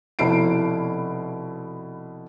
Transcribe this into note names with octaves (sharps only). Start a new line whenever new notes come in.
F1 B2 E4 C7 D7